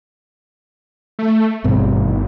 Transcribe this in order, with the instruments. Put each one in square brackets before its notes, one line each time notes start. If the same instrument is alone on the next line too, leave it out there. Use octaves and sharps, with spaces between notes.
[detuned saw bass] A3
[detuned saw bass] G#1 [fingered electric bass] G2 B2 C4